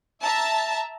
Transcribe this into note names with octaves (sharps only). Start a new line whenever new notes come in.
E5 A5 A#5